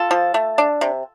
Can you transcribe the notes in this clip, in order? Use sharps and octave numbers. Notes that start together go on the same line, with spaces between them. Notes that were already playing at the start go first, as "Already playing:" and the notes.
Already playing: F4 A4
F3
A3
D4
C3